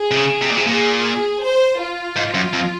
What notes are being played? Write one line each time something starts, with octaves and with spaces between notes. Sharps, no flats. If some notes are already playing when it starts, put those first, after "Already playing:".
Already playing: G#4
C3
C#3
C3
A#2
C3
A#2 G#4
C5
F4
G#2
F#2
F2